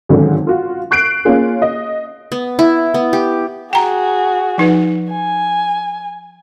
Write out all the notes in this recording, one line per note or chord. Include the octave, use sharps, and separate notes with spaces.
G#1 G#2 D3 D#3 F#3 C#4
F4 F#4
C#6 F#6 C7 D7
A#3 C#4 F4 G#4
D#5
B3
E4
B3
G4
F#4 G#4 G5 A#5
F3 D#4 B4
G#5